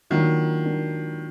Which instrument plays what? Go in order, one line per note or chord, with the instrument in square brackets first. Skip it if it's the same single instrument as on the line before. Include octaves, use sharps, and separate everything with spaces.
[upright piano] D#3 [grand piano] F#3 A#3 D4 F4 A#4
[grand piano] F#3 A#3 D4 F4 A#4